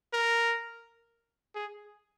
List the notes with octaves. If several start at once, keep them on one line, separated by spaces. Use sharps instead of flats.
A#4
G#4